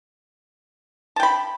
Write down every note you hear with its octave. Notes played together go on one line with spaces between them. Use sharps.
G5 A5 B5